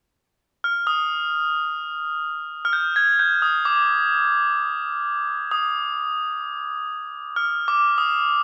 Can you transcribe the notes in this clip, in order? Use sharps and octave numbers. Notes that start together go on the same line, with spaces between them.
F6
D#6
F6
G6
G#6
G6
D#6
D6
D#6
F6
D6
D#6